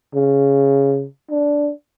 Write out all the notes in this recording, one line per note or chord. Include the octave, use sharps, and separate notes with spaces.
C#3
D4